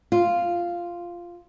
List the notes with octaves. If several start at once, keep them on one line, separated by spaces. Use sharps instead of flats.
F4